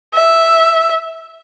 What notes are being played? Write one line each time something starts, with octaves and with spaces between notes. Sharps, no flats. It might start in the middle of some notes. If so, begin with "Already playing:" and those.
E5